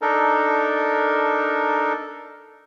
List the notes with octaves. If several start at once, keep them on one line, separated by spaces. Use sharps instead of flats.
D4 D#4 A4 A#4